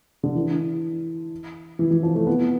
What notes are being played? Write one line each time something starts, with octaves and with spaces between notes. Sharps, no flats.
D3
E3
E3
E3
F3
A3
B3